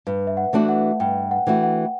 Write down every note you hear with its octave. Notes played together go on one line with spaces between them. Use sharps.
G2 B4
E5
F#5
E3 A3 D4 F#4
F#5
G2 G5
F#5
E3 A3 D4 F#4
F#5